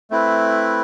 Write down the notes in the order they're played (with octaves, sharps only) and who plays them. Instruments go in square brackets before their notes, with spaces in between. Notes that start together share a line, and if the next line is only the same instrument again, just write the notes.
[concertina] A3 C4 E4 B4